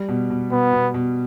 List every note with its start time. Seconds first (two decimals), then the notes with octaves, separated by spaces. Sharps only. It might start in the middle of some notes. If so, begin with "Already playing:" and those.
Already playing: G3
0.08 B2
0.30 B2
0.51 B2 B3
0.73 B2
0.94 B2